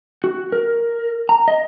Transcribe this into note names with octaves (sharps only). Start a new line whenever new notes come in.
F#4
A#4
A#5
D#5